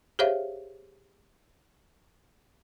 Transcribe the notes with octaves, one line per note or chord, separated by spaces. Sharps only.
G4 G#4 C5 C#5 E5 F5